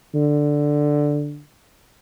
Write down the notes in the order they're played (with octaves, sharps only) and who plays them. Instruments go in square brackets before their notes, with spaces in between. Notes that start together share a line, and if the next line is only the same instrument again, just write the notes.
[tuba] D3